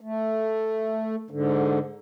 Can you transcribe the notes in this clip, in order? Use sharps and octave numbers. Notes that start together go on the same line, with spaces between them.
A3
G#2 D3